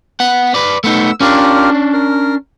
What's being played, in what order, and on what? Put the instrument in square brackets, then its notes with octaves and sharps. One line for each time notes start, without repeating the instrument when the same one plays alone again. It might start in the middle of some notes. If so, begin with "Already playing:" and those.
[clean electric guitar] B3 F#5
B4 D5
[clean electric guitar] A3 B3 D#4 [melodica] E6
[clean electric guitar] C#4 D4 [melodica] F4 G4 A#4
[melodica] A#4